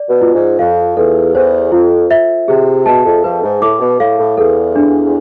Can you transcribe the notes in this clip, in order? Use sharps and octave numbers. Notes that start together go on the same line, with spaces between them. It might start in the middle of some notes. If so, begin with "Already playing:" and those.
Already playing: D5
B2
F4
G#2
F2 F5
E2 A4
E2 C5
F2 F4
E5
C3 G#4
B2 A5
F2
F2 B4
G#2
A2 D6
B2
A2 F5
A2
E2 A4
D4